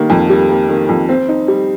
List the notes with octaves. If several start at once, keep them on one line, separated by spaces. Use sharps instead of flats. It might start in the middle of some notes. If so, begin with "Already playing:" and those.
Already playing: D#3 G3 A#3
F2
G3
A#3
D#3
F2
C4
D#4
G3